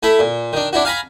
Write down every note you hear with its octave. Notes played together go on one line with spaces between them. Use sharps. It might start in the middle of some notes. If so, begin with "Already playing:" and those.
A3 E4 A4 B5
A#2
D#3 D4
D4 E4 F#4
F5 G#5 A#5 B5